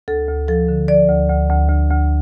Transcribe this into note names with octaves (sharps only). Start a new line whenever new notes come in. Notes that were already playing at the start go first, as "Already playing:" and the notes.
D2 A4
D2
F3 A4
D3
F3 D5
D2
D2
D2
D2
D2